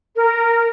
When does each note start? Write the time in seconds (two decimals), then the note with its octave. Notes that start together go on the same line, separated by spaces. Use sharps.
0.16 A#4